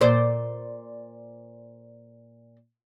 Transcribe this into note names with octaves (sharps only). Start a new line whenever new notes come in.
A#2 C5 D5